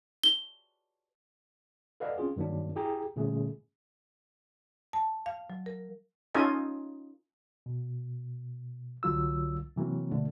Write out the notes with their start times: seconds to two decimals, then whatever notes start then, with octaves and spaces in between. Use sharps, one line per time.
0.23 G7
2.00 A4 B4 D5 D#5 F5 F#5
2.18 C4 C#4 F4 G#4
2.36 G2 D#3 F#3 A#3 D4
2.76 E4 G4 G#4 G5 A#5
3.16 A#2 D3 G3 A3 C#4 G#4
4.93 A5
5.26 F5
5.50 F#3
5.66 A#4
6.35 C#4 D#4 F4 A4 D#5 G#5
7.66 B2
9.03 C2 D3 F#3 F4 E6
9.76 C3 E3 F#3 A#3 C4
10.11 B2 D3 A3 D4